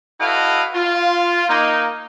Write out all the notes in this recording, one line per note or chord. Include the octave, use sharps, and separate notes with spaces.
E4 F#4 A4 B4 D#5 F5
F4
A#3 D#4